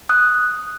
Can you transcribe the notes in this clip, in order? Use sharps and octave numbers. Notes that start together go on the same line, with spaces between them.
D#6 F#6